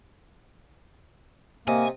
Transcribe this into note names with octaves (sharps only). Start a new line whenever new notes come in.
C3 A#3 D#5 G#5